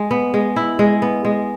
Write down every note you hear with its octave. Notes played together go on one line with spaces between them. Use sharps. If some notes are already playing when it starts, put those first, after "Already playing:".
Already playing: G#3
B3
G#3
E4
G#3
B3
G#3